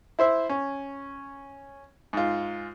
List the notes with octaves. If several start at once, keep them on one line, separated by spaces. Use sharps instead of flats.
E4 C5 E5
C#4
G#2 F4